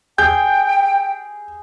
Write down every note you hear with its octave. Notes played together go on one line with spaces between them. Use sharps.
G#4 G5 G6